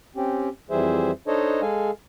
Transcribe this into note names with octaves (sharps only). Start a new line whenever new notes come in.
C4 C#4 G4
F2 E3 G3 G#4 C5 E5
D4 D#4 A4 C5 C#5 D#5
G#3 G#4 A4 F5 G#5